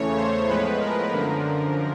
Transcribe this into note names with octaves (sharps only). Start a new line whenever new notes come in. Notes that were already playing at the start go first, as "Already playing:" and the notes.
Already playing: E2 C#3 E3 A3 C#5
C5
A2 F3 G#3 B3 B4
A#4
F#2 D3 F3